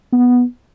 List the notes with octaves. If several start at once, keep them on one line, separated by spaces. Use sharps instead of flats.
B3